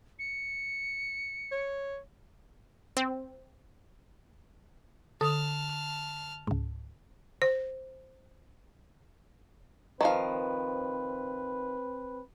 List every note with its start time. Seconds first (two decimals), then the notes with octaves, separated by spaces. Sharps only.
0.19 C#7
1.52 C#5
2.97 C4
5.21 D3 A4 A5 D#6 F6
6.47 C#2 G#2
7.42 C5
10.01 D#3 F3 C4 B4 F5